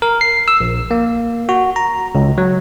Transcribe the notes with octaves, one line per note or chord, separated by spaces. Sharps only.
A#4
C7
E6
A#1
A#3
F#4
A#5
C#2
F#3